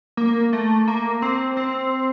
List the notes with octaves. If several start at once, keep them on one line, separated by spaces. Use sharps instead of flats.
A#3
A3
A#3
C4
C4